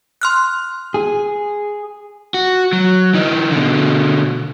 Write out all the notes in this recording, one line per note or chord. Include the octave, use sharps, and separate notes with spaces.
C6 F6 F#6
G#4
F#4
F#3
E3 D#4
B2 D3